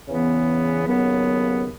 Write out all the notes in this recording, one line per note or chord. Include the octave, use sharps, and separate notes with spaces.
E2 C#3 E3 B3
D#2 C#3 F#3 B3